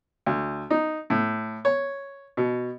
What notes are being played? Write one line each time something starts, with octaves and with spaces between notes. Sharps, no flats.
D2
D#4
A2
C#5
B2